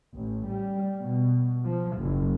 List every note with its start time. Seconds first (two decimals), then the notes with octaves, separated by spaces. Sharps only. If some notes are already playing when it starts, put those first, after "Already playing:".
0.14 A1
0.49 G3
0.99 B2
1.63 F3
1.96 F#1